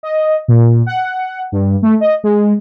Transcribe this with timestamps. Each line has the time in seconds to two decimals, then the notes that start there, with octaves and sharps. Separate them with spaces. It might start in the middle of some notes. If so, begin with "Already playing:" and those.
0.03 D#5
0.48 A#2
0.86 F#5
1.52 G2
1.82 A3
2.00 D#5
2.24 G#3